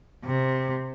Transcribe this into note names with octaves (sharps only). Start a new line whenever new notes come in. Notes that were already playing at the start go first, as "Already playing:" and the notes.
C3